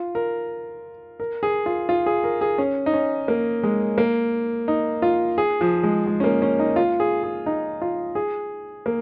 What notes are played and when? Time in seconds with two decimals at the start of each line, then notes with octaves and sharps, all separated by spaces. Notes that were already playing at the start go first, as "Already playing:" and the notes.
Already playing: F4
0.15 A#4
1.20 A#4
1.43 G#4
1.66 F4
1.89 F4
2.06 G#4
2.24 A#4
2.41 G#4
2.58 C#4
2.86 D#4
2.94 C#4
3.28 A#3
3.63 G#3
3.98 A#3
4.68 D#4
5.02 F4
5.38 G#4
5.61 F3
5.83 G#3
6.07 G#3
6.20 C#4
6.24 A#3
6.42 C#4
6.59 D#4
6.76 F4
7.00 G#4
7.24 G#4
7.46 D#4
7.82 F4
8.15 G#4
8.86 A#3